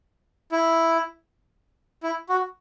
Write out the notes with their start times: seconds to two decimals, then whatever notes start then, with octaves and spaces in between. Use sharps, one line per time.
0.52 E4
2.03 E4
2.29 F#4